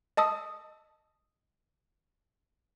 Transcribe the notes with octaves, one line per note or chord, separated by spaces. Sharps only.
D#5 A5 D#6 E6